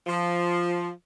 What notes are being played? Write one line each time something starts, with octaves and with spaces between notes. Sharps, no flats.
F3